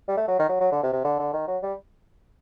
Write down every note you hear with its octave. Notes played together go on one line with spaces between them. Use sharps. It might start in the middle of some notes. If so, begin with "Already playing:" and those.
G3
A3
F#3
D#3
F#3
F#3
D3
C3
C3
D3
D3
D#3
F#3
G3